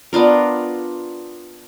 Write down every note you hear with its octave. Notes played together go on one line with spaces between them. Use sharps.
B3 D4 F4 A#4